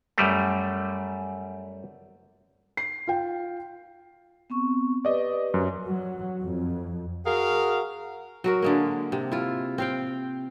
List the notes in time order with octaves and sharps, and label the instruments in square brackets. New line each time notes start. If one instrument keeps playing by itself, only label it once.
[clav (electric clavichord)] F#2 G3 A3
[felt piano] C7
F4 G5
[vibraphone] B3 C4 C#6
[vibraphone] G4 B4 [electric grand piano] D5 D#5
[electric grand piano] F#2
[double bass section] F#3
F2
[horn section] F#4 G#4 A#4 F5
[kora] F#3 F#4 A#4
D3 G#3 A#3
C3
E4 F4
C4 F5 G5